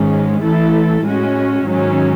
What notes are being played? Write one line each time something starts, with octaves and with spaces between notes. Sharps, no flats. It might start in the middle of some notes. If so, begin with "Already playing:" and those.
Already playing: G#2 D#3 G#3 C#4
E3 A3 E4 A4
A2 G#3 C#4 F#4
G#2 D#3 F#3 C#4